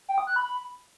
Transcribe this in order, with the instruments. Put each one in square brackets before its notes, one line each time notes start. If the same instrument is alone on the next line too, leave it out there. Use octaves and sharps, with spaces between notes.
[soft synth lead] G5
D#6
F#6
B5